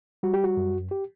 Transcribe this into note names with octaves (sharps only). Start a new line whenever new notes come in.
G3 F#4
G4
F#4
F#2
G4